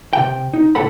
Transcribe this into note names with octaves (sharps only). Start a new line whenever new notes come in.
C3 G5
D#4
C#2 A2 A4 F#5 B5